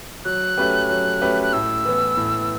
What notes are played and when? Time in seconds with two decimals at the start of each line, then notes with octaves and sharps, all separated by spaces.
0.25 F#3 F#6
0.57 A3 C#4 G4 B4
0.89 F#3
1.22 A3 C#4 G4 B4
1.43 F#6
1.53 A2 E6
1.85 E3 B3
2.17 A2